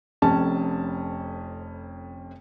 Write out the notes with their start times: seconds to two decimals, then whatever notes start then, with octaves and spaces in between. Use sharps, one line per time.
0.22 F1 F2 C#4 A5